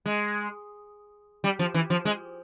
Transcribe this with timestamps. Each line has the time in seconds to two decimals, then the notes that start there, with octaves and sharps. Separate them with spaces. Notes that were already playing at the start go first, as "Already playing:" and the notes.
0.06 G#3
1.44 G3
1.59 F3
1.74 E3
1.90 F3
2.05 G#3